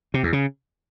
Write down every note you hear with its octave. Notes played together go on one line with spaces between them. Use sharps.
C3
E2
C#3